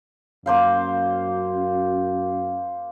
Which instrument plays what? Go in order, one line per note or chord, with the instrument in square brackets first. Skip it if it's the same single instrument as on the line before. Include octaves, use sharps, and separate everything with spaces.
[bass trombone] F#2 [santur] A#3 C5 F5